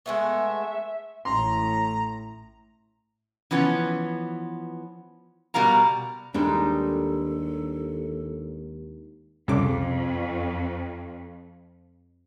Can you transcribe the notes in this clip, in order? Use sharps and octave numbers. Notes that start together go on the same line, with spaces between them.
G#3 A3 B3 E5
A1 A2 A#5 C6
E3 F3 B3 C#4
B2 G3 A#4 F5 A#5
D#2 G3 G#3 D4 D#4 A4
C2 F2 C#3 D6